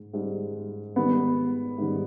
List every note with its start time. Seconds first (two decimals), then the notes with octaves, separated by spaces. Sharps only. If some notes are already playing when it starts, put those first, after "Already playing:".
Already playing: G#2
0.13 G#2 G3
0.96 G#2 D#3 G3 B3
1.78 G#2 D#3 G3